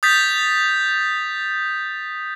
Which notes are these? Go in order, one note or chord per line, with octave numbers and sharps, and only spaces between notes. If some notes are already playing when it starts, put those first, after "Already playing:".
D#6 G6 A6 B6